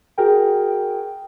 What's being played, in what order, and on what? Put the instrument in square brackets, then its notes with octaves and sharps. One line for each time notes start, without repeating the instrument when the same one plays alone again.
[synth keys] F#4 G#4 A#4 G5